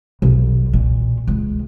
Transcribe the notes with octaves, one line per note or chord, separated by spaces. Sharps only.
B1
A#2
C#2